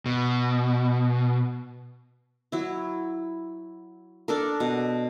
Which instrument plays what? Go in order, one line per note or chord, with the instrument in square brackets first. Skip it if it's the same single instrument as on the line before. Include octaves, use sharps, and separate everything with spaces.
[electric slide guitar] B2
[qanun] F#3 E4
D4 A4 A#4
B2